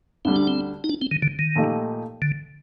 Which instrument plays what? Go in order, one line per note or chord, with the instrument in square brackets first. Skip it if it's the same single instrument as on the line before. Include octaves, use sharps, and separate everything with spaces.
[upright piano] D2 D3 G3 [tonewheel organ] C4
[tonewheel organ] D4
C4
D#4
D4
C4
D#3
D3
D#3
[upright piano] A#2 F3 A3 D#4 G4
[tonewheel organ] D3